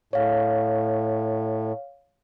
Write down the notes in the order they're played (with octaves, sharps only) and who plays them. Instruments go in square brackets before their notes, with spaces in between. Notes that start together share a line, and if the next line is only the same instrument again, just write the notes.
[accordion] A2 [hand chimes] C#5 F5